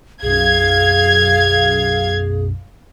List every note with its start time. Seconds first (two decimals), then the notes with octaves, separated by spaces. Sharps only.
0.22 B1 F#2 G#4 F5 G#6